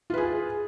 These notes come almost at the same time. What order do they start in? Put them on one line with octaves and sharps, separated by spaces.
F4 B4 G#4